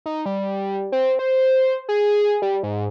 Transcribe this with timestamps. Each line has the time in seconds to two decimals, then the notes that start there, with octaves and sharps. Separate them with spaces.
0.06 D#4
0.26 G3
0.92 C4
1.19 C5
1.89 G#4
2.42 G3
2.63 G#2